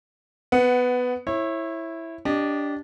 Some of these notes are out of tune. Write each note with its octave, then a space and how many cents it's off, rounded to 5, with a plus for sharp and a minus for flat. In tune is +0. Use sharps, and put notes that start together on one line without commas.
B3 +10 F#5 +0
E4 +0 C#5 -30
D4 -20 G4 +0 D#5 -35